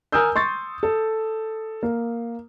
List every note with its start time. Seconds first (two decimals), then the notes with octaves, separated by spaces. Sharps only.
0.12 A#4 G#5 D#6 E6 G6
0.36 C6 C#6 A6
0.83 A4
1.83 A#3